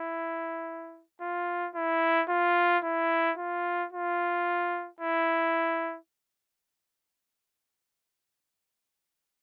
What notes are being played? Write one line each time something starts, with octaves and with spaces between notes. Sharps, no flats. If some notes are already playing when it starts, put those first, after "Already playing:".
Already playing: E4
F4
E4
F4
E4
F4
F4
E4